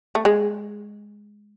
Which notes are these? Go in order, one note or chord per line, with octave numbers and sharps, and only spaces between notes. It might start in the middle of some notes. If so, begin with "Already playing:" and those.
A3
G#3